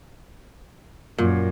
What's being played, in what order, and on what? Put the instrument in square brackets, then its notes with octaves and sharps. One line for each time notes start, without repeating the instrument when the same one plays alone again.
[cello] F#2 [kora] A#2